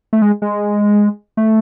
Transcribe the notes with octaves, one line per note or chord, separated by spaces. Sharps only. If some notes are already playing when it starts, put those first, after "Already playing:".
A3
G#3
G#3
A3